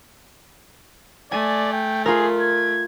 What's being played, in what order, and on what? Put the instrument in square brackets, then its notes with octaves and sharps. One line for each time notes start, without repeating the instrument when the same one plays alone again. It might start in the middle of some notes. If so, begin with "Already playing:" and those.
[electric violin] A3 [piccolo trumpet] D5 [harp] G#5
[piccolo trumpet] G5
[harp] F4 A#4 [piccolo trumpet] G#4
[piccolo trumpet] G#6